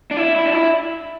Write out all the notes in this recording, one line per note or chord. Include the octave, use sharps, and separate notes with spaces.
D4
E4
E4
D4
E4